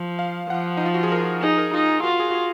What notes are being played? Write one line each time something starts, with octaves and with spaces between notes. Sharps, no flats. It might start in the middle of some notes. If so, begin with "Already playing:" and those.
Already playing: F3
F5
F3 F#5
D#4
F4
F#4
G#4
A#4
D#4 G#4
A#4
D#4 F4
F4 F#4
G#4
F#4
G#4